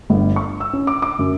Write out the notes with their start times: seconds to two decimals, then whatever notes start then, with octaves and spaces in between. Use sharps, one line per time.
0.10 G1
0.36 C#6
0.60 E6
0.73 C#4
0.87 D6
1.02 D6
1.19 F#2